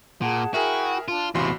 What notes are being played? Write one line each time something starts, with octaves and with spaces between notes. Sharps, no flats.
A#2 G#4 F#5 A5
E4 F#4 G#4 A#4 E5 G5 G#5
D4 F4 A5
A1 E2 C3 F#4 F5 B5 C6